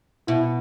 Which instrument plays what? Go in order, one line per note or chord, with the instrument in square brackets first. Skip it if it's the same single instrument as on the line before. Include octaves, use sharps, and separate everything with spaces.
[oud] B2 [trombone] E4